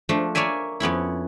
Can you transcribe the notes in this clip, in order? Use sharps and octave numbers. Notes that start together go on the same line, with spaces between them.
F3 A3 D4
A#3 C#5 D5 E5 G#5
F2 B3 C#4 E4